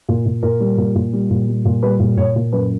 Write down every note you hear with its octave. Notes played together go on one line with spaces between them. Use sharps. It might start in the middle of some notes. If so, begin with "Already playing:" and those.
A#2
A#2
A#2 A#4
G3
A#2
A#2
G3
A#2
G3
A#2
G3 B4
A#2
A#2 C#5
A#2
F#2 B4